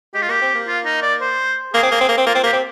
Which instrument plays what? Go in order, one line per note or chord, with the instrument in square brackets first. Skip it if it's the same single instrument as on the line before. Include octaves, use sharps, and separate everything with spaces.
[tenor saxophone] G#3 [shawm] G4
[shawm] F4
[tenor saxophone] A#3 [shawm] G4
[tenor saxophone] C4
A#3
[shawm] F4
D#4
D5
C5
[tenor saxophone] A#3 [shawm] G#4
[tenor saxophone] C4
A#3
C4
A#3
C4
[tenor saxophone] A#3 [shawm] F4
[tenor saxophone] C4
[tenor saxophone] A#3 [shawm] G4
[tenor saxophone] C4